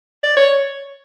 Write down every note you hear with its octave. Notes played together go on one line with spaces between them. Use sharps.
D5
C#5